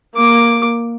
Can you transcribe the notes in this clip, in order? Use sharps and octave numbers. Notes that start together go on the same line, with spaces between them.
A#3 D6